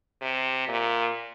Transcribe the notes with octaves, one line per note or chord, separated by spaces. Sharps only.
C3
A#2